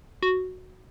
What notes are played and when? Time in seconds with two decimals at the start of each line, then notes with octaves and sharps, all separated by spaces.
0.23 F#4